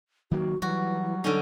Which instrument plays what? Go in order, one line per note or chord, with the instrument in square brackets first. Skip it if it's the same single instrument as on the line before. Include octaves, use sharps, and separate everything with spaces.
[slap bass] D#3 F#3 A#3 [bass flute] F#4
[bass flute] E3 [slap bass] F#3 G3 [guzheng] F#4
[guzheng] D3 C#4 D#4 [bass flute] A4